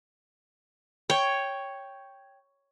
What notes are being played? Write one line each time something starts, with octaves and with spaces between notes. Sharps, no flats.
C#5 G5